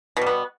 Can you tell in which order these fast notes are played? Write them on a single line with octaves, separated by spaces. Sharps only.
B2 G3 B3